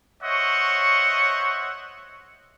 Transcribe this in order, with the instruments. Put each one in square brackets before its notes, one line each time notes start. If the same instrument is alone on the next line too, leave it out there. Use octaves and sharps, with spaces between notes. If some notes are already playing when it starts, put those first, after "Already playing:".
[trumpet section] C5 C#5 D#5 E5 F#5 C#6